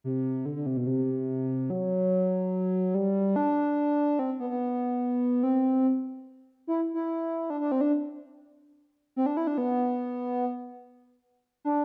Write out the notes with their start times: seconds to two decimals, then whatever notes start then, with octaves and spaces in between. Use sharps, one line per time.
0.04 C3
0.46 D3
0.56 D3
0.66 C3
0.77 B2
0.87 C3
1.70 F#3
2.94 G3
3.36 D4
4.19 C4
4.40 B3
4.50 B3
5.43 C4
6.67 E4
6.94 E4
7.50 D4
7.61 D4
7.72 C4
7.81 D4
9.16 C4
9.26 D4
9.37 E4
9.47 D4
9.58 B3
11.65 D4